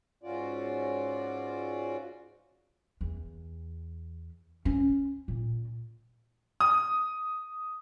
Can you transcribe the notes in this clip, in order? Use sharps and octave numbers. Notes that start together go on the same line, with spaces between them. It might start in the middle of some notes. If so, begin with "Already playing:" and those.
G#2 C#4 F4 F#4 D5
E2
C#4
A#2
D#6